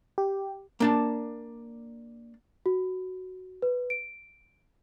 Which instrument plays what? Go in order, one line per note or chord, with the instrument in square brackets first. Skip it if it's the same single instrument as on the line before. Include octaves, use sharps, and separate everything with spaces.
[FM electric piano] G4
[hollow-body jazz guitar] A#3 D4 A5
[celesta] F#4
B4
D7